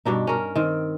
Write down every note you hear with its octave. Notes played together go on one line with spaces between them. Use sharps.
G2 B2 D4 D#4
C#4 A#4
D#3 C4